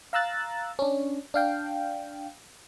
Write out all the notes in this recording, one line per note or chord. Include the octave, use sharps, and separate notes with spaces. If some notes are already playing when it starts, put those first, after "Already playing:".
F5 A#5 E6 F#6 A6
C#4 D4
D4 F5 G5